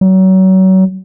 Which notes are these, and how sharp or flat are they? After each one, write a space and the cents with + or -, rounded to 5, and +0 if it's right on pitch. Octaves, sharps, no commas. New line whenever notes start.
F#3 +30